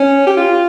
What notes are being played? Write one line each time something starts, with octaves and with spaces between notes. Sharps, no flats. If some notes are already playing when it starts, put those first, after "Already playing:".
Already playing: C#4
G4
F4